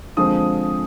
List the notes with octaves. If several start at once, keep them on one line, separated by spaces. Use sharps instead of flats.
D3 F3 G#3 C4 D#6